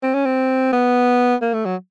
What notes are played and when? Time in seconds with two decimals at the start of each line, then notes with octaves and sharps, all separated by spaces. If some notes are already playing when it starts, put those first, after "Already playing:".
0.03 C4
0.14 C#4
0.26 C4
0.73 B3
1.42 A#3
1.53 A3
1.65 F#3